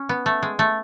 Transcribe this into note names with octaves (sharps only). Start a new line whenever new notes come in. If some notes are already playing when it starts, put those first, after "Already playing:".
Already playing: C#4
B3
A3
G#3
A3